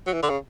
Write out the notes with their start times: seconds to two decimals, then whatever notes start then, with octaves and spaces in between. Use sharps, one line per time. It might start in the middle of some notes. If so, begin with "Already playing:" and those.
0.06 F#3
0.13 E3
0.22 D3
0.29 C#3